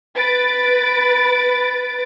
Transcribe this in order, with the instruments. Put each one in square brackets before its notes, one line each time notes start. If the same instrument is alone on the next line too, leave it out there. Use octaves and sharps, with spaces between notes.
[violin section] B4 A6 D7